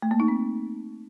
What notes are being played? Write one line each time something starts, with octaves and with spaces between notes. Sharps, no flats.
A3
A#3
D#4
C4